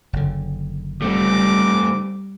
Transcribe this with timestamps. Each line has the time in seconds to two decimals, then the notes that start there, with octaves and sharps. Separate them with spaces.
0.13 F#1 D3
1.02 G3 A3 C4 D6